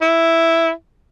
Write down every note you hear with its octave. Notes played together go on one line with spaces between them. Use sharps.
E4